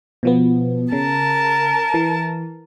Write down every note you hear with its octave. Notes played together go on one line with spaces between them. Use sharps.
B2 F3 B3
C#3 A#4 A5
E3